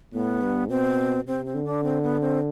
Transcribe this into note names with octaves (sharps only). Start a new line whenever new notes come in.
A2 B3
G2
B2 C4
C3 C4
C4
D3
D4
C4
B3
C4